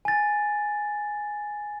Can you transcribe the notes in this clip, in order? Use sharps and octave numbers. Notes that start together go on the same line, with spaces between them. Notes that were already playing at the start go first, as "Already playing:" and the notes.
G#5 A6